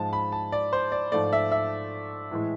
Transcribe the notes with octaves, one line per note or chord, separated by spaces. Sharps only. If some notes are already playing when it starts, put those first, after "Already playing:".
Already playing: G#2 F3 G#3 A5
B5
A5
D5
C5
D5
G#2 F3 A3 D5
E5
E5
A2 E3 G#3